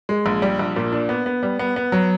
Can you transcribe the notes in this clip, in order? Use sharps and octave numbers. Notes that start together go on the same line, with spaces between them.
G#3
A#1
G3
A#1
A#2
D4
B3
B3
G3
B3
B3
F#3